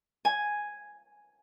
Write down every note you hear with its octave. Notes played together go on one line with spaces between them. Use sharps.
G#5